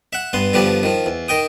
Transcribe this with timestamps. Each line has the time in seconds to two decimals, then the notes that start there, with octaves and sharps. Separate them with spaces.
0.13 E5 F#5
0.33 G2 B3 C6
0.53 G2 D3 F3 B3 G4
0.83 D#3 F3
1.06 E2
1.28 D#3 D#5 G5 D#6